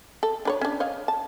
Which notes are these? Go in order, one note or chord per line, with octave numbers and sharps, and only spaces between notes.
A4
D4 B4 C#5
C#4 D4
C#5 D#5 F5
A5